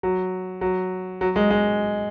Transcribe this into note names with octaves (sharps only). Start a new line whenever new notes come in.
F#3
F#3
F#3
G#3
G#3